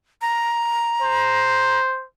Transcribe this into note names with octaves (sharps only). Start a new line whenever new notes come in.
A#5
C5